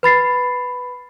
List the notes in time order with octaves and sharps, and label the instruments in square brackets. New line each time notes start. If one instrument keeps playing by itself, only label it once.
[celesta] B4 B5 A6 C7